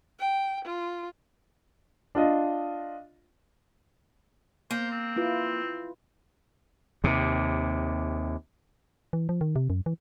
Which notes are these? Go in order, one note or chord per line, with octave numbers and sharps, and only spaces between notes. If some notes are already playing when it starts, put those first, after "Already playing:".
G5
F4
D4 F4 D#5
A#3 C5
C4
E4 F4 B4
D#2 C3
E3
F3
D#3
C3
F#2
E3